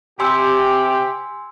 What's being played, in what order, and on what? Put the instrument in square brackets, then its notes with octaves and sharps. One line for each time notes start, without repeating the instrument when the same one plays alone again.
[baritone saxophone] C3 [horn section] G4 [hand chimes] G#5 C6 E6